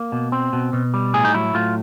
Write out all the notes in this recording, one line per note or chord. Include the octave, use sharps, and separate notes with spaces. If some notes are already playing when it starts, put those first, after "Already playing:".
Already playing: A#3
B2
C4
B2
B2
G3
A2 G#4
D#4
F#3 E4
A2 F4